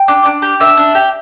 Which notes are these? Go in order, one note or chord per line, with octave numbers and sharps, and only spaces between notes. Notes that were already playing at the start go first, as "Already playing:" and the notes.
Already playing: G5
D4
D4
G4
D4 E5
D4
G4